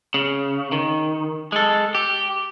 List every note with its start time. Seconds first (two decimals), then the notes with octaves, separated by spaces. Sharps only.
0.14 C#3
0.72 D#3
1.52 G#3 A4
1.95 G4